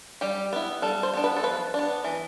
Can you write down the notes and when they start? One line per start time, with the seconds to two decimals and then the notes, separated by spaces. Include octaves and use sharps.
0.21 G3 G4
0.53 B3 E4
0.82 G3 A4
1.03 C5
1.14 B3 D4
1.24 B4
1.36 A4
1.43 F3 B4
1.74 B3 D4
2.04 E3